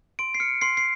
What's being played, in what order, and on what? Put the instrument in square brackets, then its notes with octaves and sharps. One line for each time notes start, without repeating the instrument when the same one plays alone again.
[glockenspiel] C6 D7
C7
F6 C#7
C6 C7
C7